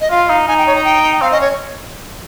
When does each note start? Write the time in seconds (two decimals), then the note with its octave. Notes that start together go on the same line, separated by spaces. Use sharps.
0.01 D#5
0.10 F4 F5
0.30 D#4
0.48 D#4 G#5
0.58 G5
0.67 C#5
0.76 A#5
0.85 G5
1.22 C4 F5
1.32 D#5
1.34 C#4
1.41 C#5